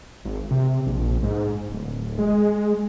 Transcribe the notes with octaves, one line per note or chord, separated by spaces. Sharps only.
G#1
C3
A#1
G#2
D1
G#3